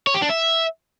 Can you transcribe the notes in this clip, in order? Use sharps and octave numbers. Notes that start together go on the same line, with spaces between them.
C#5
G4
D4
E5